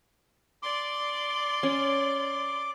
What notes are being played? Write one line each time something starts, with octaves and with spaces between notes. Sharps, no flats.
D5 C6 D6
C#4